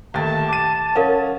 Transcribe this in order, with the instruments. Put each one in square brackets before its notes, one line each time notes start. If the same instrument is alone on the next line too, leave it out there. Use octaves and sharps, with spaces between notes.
[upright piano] D#2 A3 A6 [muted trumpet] A5
[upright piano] D6 D#7
[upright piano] C#4 [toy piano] A#4 F5 F#5